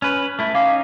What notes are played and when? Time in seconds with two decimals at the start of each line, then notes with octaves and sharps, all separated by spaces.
0.02 C#4 B4
0.39 A3 E4
0.55 C#4 D#4 F5 D6 C7